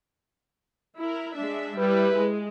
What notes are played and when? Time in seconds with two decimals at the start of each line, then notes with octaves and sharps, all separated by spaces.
0.98 E4 A#4
1.34 G#3 D4 E5
1.78 G3 E4 G4 B4
2.17 G#3